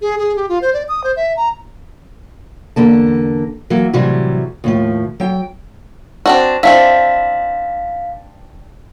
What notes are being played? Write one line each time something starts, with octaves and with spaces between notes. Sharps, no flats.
G#4
G#4
G4
F4
C5
D5
D#6
C5
E5
A#5
E2 D3 A#3 A5
E3 F#3 A#3
A2 C3 E3 F#3 G3
D#2 A2 F3
F#3 G5
C4 D4 F#4
C4 D4 E4 F5 B6